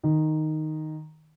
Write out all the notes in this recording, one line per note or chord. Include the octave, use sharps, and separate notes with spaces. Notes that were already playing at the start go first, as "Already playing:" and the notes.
D#3